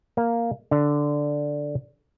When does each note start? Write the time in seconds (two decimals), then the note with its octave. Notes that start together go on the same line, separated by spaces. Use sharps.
0.17 A#3
0.71 D3